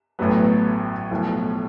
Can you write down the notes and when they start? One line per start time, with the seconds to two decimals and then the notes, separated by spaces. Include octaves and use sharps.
0.19 A1 A2 F#3 B3
1.11 B1 A2 F3